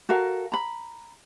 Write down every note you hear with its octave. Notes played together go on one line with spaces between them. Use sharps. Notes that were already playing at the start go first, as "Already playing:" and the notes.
F#4 A4 A#4 F5
A#5 B5